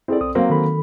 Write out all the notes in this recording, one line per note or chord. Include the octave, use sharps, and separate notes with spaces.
C4 E4 G#4 A4 D5
B1 D#6
F#3 A#3 C4 C5 F5
D#3 A4 B5